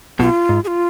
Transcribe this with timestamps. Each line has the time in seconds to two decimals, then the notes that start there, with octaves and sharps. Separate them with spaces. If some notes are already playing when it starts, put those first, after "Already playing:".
0.19 B1 B2 F4
0.49 G#2
0.64 G#4
0.67 F4